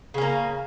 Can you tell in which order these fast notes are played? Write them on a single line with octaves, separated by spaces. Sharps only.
C#3 C#4 A#3